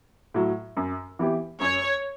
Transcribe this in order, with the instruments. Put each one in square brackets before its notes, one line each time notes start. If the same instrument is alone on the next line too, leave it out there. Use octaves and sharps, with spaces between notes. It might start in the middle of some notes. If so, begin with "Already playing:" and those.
[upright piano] A2 F#3
F#2
E3 B3 E4 G4
[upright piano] F#2 [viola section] C#5